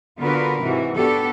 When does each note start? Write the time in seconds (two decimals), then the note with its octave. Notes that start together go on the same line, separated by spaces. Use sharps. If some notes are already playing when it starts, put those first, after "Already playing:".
0.20 D3 B3 F4 F#4 A#4 B4
0.63 G#2 C3 E3 F#4
0.95 B3 D4 F#4 G4 A4